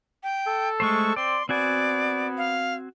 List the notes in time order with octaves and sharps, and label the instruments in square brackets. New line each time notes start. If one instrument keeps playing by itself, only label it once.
[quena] G5
[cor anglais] A4
[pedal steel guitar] G#3 A3 C5 [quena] C#6
[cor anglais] C4 [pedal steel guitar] D5 [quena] C6
[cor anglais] B3 [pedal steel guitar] C4 F#4 G#5 [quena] D5
[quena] F5